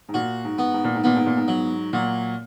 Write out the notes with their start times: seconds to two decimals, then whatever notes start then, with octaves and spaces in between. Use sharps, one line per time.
0.09 G#2
0.14 A#2 F#4
0.44 G#2
0.58 B3
0.74 G#2
0.84 A#2
0.95 G#2
1.04 A#2 B3
1.16 G#2
1.26 A#2
1.37 G#2
1.48 F#3
1.93 A#2 F#3